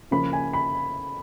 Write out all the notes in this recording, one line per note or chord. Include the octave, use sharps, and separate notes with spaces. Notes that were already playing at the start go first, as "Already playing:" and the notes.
C#3 F3 A#3 B5
G#5
B5